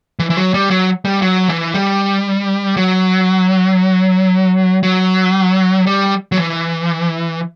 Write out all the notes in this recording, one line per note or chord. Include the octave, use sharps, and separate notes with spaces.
E3
E3
F#3
G3
F#3
G3
F#3
E3
G3
F#3
F#3
G3
F#3
E3